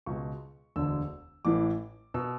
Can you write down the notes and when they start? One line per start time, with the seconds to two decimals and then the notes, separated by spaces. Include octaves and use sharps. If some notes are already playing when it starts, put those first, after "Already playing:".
0.06 C#2 B2 C#6
0.76 E1 D2 D3 E6
1.45 A1 A2 E3 D6
2.14 B2 E6